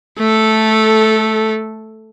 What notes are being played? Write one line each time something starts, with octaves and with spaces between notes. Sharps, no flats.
A3 A4